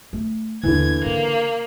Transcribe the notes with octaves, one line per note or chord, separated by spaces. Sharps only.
A3
D#2 D3 E3 B3 G#6
C#3 A#3